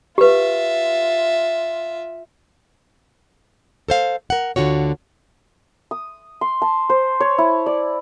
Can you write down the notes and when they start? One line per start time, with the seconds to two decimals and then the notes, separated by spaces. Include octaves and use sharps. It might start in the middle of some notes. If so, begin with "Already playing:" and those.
0.18 F4 G4 B4 E5
3.88 A4 C5 F5
4.30 A#4 F#5
4.56 D2 D3 F4 F#4 C#5
5.91 D#6
6.41 C6
6.62 A5
6.90 C5
7.20 C#5
7.38 E4
7.66 D5